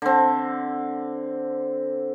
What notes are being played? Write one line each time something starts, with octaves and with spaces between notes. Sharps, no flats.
D3 C4